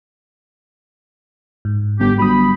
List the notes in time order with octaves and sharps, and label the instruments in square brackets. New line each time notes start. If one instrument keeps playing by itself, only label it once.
[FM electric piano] G#2
[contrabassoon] G1 [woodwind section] G4
[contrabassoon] G1 [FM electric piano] F#3 D#6 [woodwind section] B5